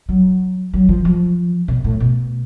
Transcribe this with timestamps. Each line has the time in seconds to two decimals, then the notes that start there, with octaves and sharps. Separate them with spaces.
0.09 F#3
0.73 F#3
0.89 F3
1.05 F3
1.68 B2
1.84 A2
2.00 B2